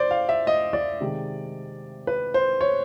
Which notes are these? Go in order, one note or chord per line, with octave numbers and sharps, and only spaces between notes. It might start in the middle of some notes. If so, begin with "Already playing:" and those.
Already playing: C5 D5
F5
E5
D#5
D5
C3 D#3 G#3
B4
C5
C#5